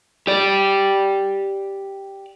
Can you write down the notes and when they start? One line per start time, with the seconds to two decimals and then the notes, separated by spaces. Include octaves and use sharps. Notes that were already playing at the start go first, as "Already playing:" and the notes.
0.27 G4 D5